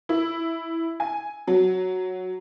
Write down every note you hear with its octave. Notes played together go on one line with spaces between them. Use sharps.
E4
G#5
F#3